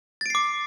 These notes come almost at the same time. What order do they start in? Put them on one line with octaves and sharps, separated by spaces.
A6 D7 C7 D6